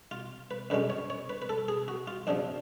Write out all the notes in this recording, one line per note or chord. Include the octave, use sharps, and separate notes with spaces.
F4
B4
F#2 D3 G#3 C#4 B4
C#5
C#5
B4
B4
A4
G#4
F#4
F4
F#2 C#3 F3 D4